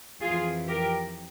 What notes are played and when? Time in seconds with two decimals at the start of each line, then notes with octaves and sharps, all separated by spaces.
0.20 F2 E3 F4 G#4
0.67 G4 A#4